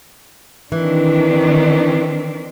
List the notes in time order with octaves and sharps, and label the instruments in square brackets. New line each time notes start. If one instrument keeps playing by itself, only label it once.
[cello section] D#3 C4 D4 [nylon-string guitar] E3